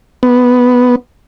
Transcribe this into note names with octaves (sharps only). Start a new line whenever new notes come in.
B3